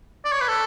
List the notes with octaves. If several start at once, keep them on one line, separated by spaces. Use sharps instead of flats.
D5
C#5
B4
A4